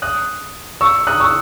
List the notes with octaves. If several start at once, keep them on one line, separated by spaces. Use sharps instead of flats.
D#6 F#6
C#6 E6
D#6 F#6
C#6 E6